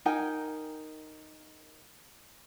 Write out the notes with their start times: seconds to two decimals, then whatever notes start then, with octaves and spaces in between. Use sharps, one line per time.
0.06 D#4 A#4 G5 G#5